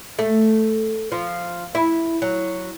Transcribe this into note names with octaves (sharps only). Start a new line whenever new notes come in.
A3
F3
E4
F#3